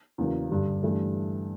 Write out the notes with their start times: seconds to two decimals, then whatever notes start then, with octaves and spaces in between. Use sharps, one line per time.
0.18 E2 C#3 F#3 A#3
0.51 G2 D3 G3
0.83 G2 E3 A3